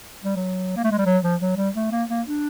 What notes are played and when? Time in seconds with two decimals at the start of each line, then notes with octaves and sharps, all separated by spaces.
0.24 G3
0.36 F#3
0.76 A#3
0.84 A3
0.91 G#3
0.98 G3
1.05 F#3
1.23 F3
1.41 F#3
1.57 G3
1.75 A3
1.91 A#3
2.09 A#3
2.27 D4